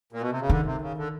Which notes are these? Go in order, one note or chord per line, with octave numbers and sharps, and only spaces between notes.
A#2
B2
C3
C#3
D3 D#3
C3
C#3
D3